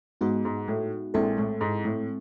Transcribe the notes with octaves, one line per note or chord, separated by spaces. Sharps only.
G#2 G#3 B3 D#4 F#4
G#2
A2
A#1 A#2 G#3 C4 E4 A4
A2
G#2
A2